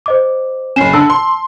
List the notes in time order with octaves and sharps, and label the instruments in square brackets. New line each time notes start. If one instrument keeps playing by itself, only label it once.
[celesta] C5 D#5 D6
[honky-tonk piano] F#1 C#4 [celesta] C7 E7
[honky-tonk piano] D3 [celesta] A5 E6
[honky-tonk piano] C6